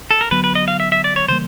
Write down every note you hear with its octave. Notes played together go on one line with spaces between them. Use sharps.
A4
A#4
D3 F#3 B3 B4
B4
D#5
F5
E5
E5
D5
C#5
C#3 E3 G3 A#3 C5